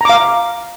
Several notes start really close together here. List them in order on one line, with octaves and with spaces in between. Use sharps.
A#5 D6 F5